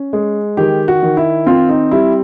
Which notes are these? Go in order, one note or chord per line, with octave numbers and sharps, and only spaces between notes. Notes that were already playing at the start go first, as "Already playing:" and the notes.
Already playing: C#4
G#3
D#3 G4
F#4
D#3
E4
C4 F4
D#4
G3 E4